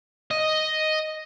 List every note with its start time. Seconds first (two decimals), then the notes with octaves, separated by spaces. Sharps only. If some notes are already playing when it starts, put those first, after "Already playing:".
0.31 D#5